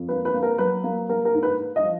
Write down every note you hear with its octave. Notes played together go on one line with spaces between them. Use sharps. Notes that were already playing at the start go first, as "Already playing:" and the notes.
Already playing: F2
A#3 B4
B4
A#3
A#4
F#3 B4
A#3
A#3 A#4
A#4
G#2
B4
G#2
D#5
F3